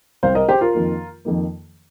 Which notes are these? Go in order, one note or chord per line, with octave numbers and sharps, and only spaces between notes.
C2 C3 G3 C4 C5 F5
A#4 D#5
G4 C5
F4 A#4
F2 D#3 A#3
F2 D#3 A#3